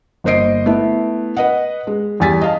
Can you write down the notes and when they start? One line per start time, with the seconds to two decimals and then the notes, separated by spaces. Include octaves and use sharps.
0.24 G1 A#3 C5 D#5 C7 D7
0.66 A3 B3 E4
1.37 B4 D#5 F#5
1.87 G#3
2.20 E2 G3 G#5 A6 B6
2.41 D#5 F5 A5